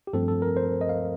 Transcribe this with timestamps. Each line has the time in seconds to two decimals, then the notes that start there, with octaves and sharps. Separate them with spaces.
0.07 G4
0.13 G2 F3 A3 C4 A4
0.28 A4
0.42 A#4
0.57 C5
0.81 D#5
0.89 F5